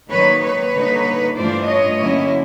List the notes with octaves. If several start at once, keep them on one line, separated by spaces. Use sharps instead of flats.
D#3 F#3 A#3 D#4 B4 C#5
B4 C#5
D3 G3 A#3 D#4
G2 E3 A3 D4 F4 C5 D5
C#5 D#5
D3 F#3 A#3 C#4 E4